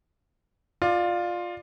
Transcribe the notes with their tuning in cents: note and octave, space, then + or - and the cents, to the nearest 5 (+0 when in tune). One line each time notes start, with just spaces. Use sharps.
F4 +10 D5 +20